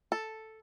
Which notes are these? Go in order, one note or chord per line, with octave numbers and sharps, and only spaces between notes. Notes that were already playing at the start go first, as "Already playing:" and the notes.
A4